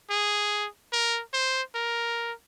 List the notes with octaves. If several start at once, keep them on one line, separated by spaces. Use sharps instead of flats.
G#4
A#4
C5
A#4